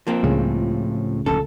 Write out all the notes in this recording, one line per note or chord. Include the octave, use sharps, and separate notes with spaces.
F3 A#3 C4
C#2 A2 C#3 G3
D1 A#1 C#4 A4